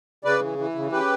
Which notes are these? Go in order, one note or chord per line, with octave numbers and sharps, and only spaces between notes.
C#3 B4 D5
E3
E3
C#3
C#3 G4 B4